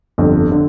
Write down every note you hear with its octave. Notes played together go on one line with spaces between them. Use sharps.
G1 F2 D3
D3